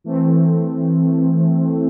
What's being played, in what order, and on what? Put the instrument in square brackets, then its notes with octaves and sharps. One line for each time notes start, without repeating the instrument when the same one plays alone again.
[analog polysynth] E3 A3 C4